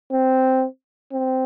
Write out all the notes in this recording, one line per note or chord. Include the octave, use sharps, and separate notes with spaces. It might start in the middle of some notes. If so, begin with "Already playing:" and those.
C4
C4